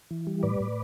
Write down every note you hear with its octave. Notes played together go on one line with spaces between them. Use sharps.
E3
G3
A2 B4 D5
A2